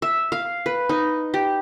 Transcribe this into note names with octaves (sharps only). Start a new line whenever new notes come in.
E5
F5
B4
D#4
G4